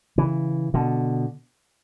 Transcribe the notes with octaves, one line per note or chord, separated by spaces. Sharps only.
C#3 E3
B2 D3